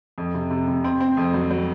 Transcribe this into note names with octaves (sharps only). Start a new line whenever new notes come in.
F2
C3
C3
C3
C4
C4
F2
F#3
F#3